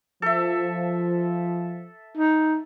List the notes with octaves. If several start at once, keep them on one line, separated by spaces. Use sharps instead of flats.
F3 A4 E5
D#4